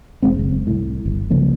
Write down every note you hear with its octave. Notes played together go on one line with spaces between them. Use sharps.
E1 G#3 C4
F#1
C2 A2
G1
C2 C#3 F3 A#3